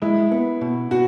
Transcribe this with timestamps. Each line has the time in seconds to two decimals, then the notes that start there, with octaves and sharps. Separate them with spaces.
0.02 G#3 E4
0.32 B3
0.61 B2
0.91 B2 F#4